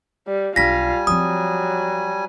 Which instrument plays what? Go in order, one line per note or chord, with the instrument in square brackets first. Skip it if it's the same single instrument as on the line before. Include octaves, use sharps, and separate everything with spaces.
[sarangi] G3
[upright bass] B1 D4 [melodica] G3 G#5 [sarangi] F4 [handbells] A#6 B6
[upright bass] F3 C4 [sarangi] F#3 [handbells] D#6